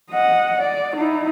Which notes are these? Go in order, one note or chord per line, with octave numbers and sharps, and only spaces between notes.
D#5 F#5
D5
D#4 E4